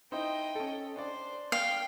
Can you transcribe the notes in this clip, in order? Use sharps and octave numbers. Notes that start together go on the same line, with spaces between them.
D#4 E4 C5 D#5 G5
C#4 A4
D4 C5 D5
F5 G5